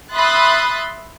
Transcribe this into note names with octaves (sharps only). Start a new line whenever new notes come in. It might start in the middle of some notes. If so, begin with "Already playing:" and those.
E5 B5 C6 D#6 F#6 A6